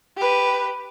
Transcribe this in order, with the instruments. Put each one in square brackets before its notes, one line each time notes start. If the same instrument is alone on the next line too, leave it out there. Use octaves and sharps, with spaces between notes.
[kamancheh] G4 B4